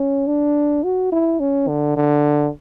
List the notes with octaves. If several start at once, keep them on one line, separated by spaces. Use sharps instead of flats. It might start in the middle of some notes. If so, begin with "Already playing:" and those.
Already playing: C#4
D4
F#4
E4
C#4
D3
D3